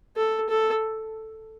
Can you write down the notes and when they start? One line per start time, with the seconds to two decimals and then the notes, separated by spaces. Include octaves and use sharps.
0.16 A4
0.49 A4